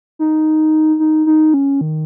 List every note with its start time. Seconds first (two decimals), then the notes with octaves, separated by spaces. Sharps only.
0.19 D#4
0.99 D#4
1.26 D#4
1.54 C#4
1.81 D#3